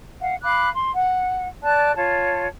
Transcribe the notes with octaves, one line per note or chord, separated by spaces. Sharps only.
F5 F#5
F5 B5 D6 F#6
C6
F#5
D5 A5 F#6
F4 C#5 A5